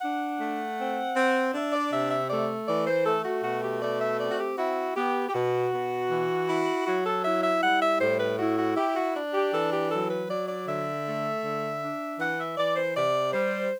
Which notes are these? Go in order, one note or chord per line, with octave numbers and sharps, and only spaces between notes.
D4 F#5
A3
C4
C4
D4 E5
D5
C3 E5
E5
A3 D5
E3 D5
C5
A3 A4
F#4
B2 F#4
G4
A3 D5
E5
C4 D5
F#4
G4
E4 F#4
B3 G4
G4
B2 F#4
B2
E3
E4
F#3 F#4
A4
E4 E5
E5
G3 F#5
E5
A2 C5
B4
E4 F#4
F#4
E4 G4
F#4
D4
G4
E3 A4
G4
F#3 A4
B4
F#3 D5
D5
D3 E5
A3
D3
D4
E3 F#5
E5
E3 D5
C5
C3 D5
G3 C5